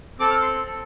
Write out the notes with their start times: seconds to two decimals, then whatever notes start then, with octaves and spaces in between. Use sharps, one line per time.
0.19 C4 A4 D6
0.30 F6
0.42 C6
0.65 C4 A4